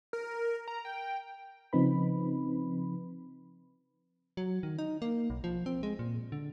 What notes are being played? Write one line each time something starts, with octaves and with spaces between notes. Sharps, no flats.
A#4
A#5
G5
C#3 F3 C4 D#4 B4 B5
F#3
D#3
D#4
A#3
B1
F3
C4
G#3
A#2
D3